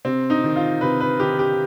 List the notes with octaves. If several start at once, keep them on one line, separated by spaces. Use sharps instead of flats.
C3 C4
D#4
D#3
F4
C3 B4
B4
D#3 G4
G4